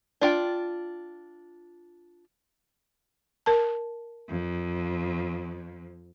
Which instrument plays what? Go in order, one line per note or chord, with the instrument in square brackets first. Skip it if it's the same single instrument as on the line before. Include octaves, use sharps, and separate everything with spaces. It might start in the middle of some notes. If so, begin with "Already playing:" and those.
[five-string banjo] D4 F4 G5
[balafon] A#4 A5
[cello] F2